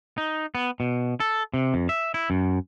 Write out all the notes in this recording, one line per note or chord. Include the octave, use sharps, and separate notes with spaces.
D#4
B3
B2
A4
C3
F2
E5
E4
F#2